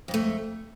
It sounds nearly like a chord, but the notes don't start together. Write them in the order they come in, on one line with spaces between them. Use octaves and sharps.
F2 G#2 A3